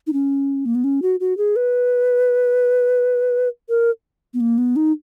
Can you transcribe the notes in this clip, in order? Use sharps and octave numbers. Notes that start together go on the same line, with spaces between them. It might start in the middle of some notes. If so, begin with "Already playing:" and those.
D#4
C#4
A#3
B3
C#4
F#4
F#4
G#4
B4
A#4
B3
A#3
B3
D#4